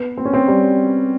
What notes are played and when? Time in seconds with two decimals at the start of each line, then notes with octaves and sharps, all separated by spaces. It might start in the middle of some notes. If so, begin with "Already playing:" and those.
Already playing: B3
0.17 C4
0.25 C#4
0.34 C4
0.48 G3